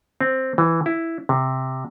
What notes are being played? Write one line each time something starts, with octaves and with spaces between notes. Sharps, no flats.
C4
E3
E4
C3